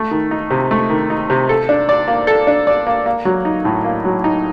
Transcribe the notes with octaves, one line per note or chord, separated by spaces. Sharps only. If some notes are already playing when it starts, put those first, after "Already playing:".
Already playing: A3
D#3
D#4
C3
A3
D#3
D#4
C3
A4
D4
D5
A#3
A4
D4
D5
A#3
A#3
F#3
D#4
A2
A#3
F#3
D#4